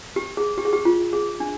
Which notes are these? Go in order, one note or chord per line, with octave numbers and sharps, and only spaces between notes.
G4
G#4
G4
G#4
G4
F4
G#4
D4